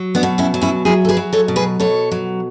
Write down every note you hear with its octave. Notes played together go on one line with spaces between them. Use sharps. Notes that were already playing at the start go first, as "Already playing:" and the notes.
Already playing: F#3
B3 D4
B2
C#4 E4
F#3
C#4 E4
F#3 E4 G#4
A4
G#4 B4
F#3
A4 C#5
B2
G#4 B4
B2 A4 C#5
F#3